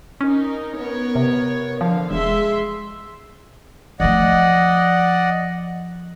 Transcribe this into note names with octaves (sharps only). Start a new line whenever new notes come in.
C#4 D#4 A#4
B3 A#4 C#5
C3
D3 F3 F5
E1 G#3 E5 C6
F3 A3 D5 D#5 F#5